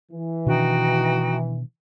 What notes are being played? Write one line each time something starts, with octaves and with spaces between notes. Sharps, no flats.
E3
B2 D#3 D4 D#4 F#4 G5